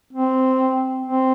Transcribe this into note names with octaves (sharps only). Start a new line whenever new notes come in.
C4
C4